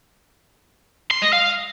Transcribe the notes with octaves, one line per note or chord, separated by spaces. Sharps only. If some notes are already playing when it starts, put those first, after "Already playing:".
C6
D#5
F5